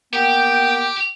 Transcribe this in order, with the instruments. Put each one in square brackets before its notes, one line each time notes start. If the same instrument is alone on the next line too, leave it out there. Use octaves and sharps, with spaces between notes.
[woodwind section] A#3 B3 G5 [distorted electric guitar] G4